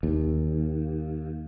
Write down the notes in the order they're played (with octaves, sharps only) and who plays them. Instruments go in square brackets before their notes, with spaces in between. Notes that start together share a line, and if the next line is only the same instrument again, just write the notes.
[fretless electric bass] D#2